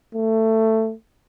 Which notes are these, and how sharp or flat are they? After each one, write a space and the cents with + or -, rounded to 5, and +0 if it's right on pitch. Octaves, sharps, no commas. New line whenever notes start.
A3 +15